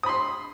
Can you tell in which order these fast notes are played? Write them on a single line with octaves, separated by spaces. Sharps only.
D#6 B5 C6